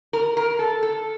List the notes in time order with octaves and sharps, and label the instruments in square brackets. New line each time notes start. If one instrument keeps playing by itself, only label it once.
[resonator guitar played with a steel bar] A#4
A#4
A4
A4